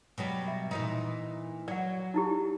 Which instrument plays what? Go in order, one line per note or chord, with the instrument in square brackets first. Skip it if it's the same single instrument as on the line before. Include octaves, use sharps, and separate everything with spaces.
[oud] B2 F#3 G3
[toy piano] E5
[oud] A#2 E3 D#4
[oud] F#3 [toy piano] D5 F#5
[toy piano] D#4 E4 G4